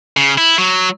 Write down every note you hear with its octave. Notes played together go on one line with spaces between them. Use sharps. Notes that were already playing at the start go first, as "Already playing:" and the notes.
C#3
E4
F#3